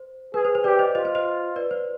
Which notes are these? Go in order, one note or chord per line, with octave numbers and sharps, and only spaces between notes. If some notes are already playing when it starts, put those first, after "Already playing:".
Already playing: C5
G#4 B4
C5
C5
G4 B4 D5
C5 D#5
F4 C5 D#5
C5 D#5
C5 D#5
B4 D5
C5